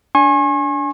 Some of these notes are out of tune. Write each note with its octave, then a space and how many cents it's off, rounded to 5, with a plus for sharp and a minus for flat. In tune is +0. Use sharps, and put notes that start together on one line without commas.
D4 -20 G#5 +0 C#6 -40